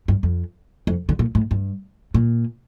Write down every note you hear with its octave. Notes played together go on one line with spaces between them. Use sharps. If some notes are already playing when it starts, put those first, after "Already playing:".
G2
F2
F2
D3
A#2
A2
G2
A#2